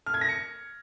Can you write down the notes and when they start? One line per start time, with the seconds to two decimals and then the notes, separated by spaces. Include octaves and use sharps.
0.06 F6
0.14 G#6
0.21 A#6
0.29 C#7